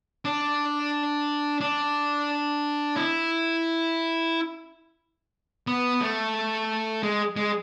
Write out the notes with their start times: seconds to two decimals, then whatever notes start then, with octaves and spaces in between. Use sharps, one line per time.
0.25 D4
1.61 D4
2.96 E4
5.67 B3
6.01 A3
7.03 G#3
7.37 G#3